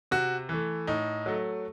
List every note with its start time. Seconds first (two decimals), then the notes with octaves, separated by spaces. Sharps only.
0.11 C3 F#4
0.49 E3 A3
0.87 A2 D#4
1.26 F#3 A3